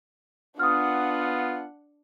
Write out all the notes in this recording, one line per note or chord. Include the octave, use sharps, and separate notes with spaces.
B3 D4 F4 F#5 D#6 F6